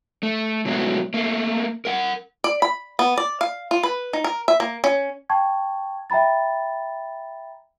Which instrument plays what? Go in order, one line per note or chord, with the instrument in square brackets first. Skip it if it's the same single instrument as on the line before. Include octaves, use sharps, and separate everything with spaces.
[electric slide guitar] A3
B2 F#3 G#3 A3 B3
A3 A#3
A#4 F5 F#5
[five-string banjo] D5
B5
B3
D5
F5
F4
B4
D#4
A#4
E5
A#3
C#4
[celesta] G5 A5 C#6 G#6
E5 G5 A#5 B5 A6